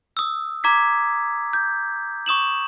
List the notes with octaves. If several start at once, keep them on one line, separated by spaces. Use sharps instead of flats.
D#6 E6
A#5 D6 G#6 B6
G6
C#6 D#6 E7 F#7